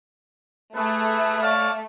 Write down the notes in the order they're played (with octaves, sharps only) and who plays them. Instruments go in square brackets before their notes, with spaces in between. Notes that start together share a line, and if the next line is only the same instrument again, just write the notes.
[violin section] A3 [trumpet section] E4 G#4 B4
[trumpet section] C#5 D5 F5